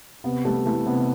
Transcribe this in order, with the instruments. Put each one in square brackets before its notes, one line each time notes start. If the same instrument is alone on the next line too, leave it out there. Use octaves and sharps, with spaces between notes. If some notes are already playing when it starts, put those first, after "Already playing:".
[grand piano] C3 B3
G3 A3
E3 A3
C3 B3